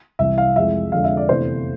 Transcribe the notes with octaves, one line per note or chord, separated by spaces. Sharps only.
C2 C3 E3 E5
F5
F2 E3 G#3 E5
F2 D3 G#3 F5
E5
D5
E2 C3 E3 A3 C5